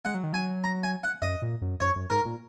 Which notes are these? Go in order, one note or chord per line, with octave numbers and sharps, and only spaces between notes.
G#3 F#5
F#3
D#3
F#3 G#5
A#5
G#5
F#5
F#2 D#5
A#2
F#2
F#2 C#5
F#2
G#2 A#4
A#2